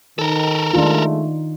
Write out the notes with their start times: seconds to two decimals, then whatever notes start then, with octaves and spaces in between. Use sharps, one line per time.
0.19 D#3 A4 A#4
0.74 D#3 G#3 A3 D4 D#4 F4